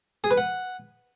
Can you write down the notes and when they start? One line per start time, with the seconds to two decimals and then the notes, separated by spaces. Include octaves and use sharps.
0.24 G#4
0.31 B4
0.37 F#5